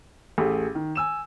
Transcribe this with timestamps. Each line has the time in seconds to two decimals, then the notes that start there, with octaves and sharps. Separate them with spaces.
0.38 A1 A3 G4 G#4
0.75 D#3
0.95 G#5 E6 E7